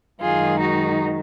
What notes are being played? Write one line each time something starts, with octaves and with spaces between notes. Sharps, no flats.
F#2 D#3 G#3 F4 G#4
D#4 F#4